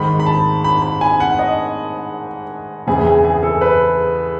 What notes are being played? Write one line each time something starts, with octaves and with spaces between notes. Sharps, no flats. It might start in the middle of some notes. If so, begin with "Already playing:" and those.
Already playing: G#2 D#3 B5
B5
A5
B5
B5
G#5
F#5
D#5
E2 C#3 E3 G#4
G#4
G#4
A4
B4